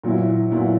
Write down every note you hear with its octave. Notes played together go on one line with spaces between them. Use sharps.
A#2 F#3 B3 E4
A#2 F#3 B3 E4